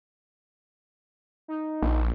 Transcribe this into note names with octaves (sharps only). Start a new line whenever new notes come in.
D#4
A#1